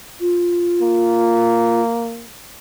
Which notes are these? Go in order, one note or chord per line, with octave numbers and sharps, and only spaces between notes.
F4
A#3